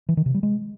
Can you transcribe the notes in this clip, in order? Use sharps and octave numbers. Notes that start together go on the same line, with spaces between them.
E3
D#3
C3
G3
G#3